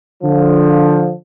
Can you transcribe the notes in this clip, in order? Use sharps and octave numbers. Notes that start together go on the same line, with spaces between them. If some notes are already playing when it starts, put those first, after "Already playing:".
D3 F3